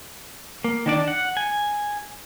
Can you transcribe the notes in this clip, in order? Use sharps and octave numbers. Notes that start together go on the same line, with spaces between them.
A#3
D#3 D4 D5
F#5
G#5